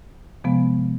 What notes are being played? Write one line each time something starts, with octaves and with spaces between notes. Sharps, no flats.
C3 F3 G#3 B3